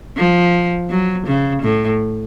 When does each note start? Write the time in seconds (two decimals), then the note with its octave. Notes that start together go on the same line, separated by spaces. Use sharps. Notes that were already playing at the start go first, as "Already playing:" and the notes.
0.17 F3
0.90 F#3
1.27 C#3
1.62 A2